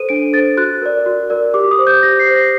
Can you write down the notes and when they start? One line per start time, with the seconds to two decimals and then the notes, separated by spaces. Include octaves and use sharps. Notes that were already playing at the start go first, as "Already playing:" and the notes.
Already playing: A4 C5 D#7
0.09 D4 D7
0.33 A4 C5 A6
0.57 F#4 F#6
0.82 A#4 D5
1.06 F#4
1.30 A#4 D5
1.54 G4 D6
1.71 D#6
1.78 C5
1.87 G6
2.03 G4 A#6
2.19 C7
2.28 C5
2.35 A#6